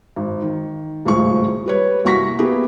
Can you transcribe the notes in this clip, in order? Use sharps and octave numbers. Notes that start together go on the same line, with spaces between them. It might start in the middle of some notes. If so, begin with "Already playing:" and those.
G#1
D#3
D#1 G#1 C#2 A2 G#4 C#6
G3 B4 C#5
C2 A#3 F#4 C#6 A#6 B6
A#3 B3 E4 G4 G#4